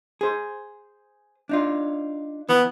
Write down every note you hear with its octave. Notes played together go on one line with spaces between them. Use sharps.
G#4 C5
D4 D#4 F4
E3 B3